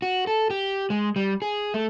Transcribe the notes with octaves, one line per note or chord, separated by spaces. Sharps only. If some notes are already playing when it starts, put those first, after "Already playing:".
F#4
A4
G4
G#3
G3
G#4
A3